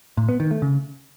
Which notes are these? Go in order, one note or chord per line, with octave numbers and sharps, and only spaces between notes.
A2
B3
D#3
A3
C#3